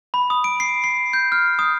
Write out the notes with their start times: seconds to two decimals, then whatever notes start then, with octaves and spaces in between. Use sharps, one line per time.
0.14 B5
0.30 D#6
0.44 D7
0.60 C7
0.84 C7
1.13 G6
1.32 F6
1.59 D#6